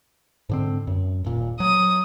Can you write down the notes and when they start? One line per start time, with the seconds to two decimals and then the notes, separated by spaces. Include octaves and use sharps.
0.49 G#2 D3 C4
0.87 F#2
1.24 D#1 A#2
1.60 F#3 D#6